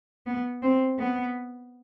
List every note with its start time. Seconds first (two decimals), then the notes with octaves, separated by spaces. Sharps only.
0.26 B3
0.62 C4
0.99 B3